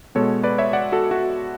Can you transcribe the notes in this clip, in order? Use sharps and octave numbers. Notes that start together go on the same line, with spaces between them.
B2 G#3 B3 A4 C#5
B4 D5
C#5 E5
D5 F#5
F#4 A4
F#4